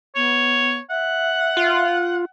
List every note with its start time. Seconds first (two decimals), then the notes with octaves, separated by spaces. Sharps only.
0.15 B3 C#5
0.90 E5 F#5
1.57 F4